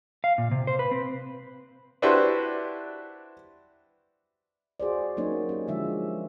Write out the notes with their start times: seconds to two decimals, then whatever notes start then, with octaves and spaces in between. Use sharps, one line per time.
0.24 F5
0.38 A#2
0.51 C3
0.67 C5
0.79 B4
0.91 C4
2.02 D4 E4 F#4 G4 B4 C5
4.80 F#4 G#4 C5 D5
5.17 F#3 A#3 C#4 D#4 C#5
5.49 C#4 G4
5.68 D3 F3 G#3 E5